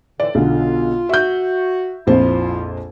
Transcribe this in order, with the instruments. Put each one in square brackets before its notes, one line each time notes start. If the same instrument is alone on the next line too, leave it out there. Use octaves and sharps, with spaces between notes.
[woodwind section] A2 D3 E3 [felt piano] D5
[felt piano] B1 D3 [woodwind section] F4
[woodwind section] F#4 [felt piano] E5 G6
[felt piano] A#1 F2 C5 [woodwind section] F3 E4 F4